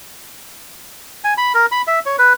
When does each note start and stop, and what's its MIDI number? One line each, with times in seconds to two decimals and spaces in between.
1.24 1.34 80
1.38 1.53 83
1.55 1.66 70
1.72 1.82 83
1.87 1.99 76
2.06 2.16 73
2.18 2.33 71